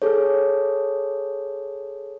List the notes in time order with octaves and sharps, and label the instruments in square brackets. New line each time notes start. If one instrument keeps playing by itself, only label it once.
[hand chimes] G#4 A4 C#5